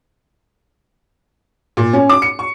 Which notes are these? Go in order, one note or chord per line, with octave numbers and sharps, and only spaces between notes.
A#2
C#4
D6
C#7
C#6